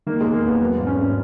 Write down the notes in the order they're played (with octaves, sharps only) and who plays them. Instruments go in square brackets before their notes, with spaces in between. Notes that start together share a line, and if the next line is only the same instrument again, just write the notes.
[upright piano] D#3 A#3
E1 G#3
A#3
E1 B3
F#3 B3
G#1
C#4
G#1